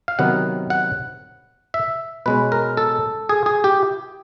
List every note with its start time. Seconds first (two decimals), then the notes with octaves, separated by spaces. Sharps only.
0.08 F5
0.19 C3 D#3 F#3 B3 F#5
0.70 F#5
1.74 E5
2.26 B2 G#3 C#4 B4
2.52 A#4
2.77 A4
3.29 G#4
3.46 G#4
3.64 G4